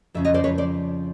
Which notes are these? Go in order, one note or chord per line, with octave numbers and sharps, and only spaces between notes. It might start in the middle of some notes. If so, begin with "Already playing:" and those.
F2 C#3 F3 E5
C#5 D#5
C5 D5
B4 C#5
C5 D5